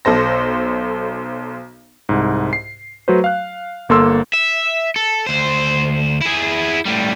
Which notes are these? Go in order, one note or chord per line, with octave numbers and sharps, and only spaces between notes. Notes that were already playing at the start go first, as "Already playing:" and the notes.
B1 A4 C5 A#6
C2 G#2
C7
F#3 A3 F#4 B4 C5
F5 F#6
G1 A#3 A4 C6 E6
E5
A4
D2 C5
E4 G#4
A2 G3